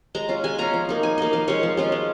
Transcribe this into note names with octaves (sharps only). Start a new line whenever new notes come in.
G#3 A#5
C#4 F4
G#3 G#5
C#4 F4 A#5
F3
A#3 D#4
F3 G#5
A#3 D#4 D#5
F3 F5
G#3 C#4 F4 C#5
F3
G#3 C#4 F4
G#3